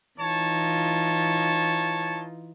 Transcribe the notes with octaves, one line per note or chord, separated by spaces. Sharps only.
E3 D#4 F4 C#5 A5